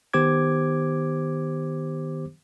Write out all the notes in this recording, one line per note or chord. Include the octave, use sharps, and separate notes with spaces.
D#3 B3 G4 C5 D6 G#6